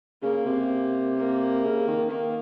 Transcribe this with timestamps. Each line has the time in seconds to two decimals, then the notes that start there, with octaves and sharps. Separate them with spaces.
0.22 C#3 A#3
0.46 C3
1.17 A#3
1.64 C#3
1.88 D#3
2.10 D#3 A#3